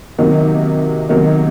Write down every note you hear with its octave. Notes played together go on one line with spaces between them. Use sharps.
C3 D#3 F#3 A#3 D#4
C3 D#3 F#3 A#3 D#4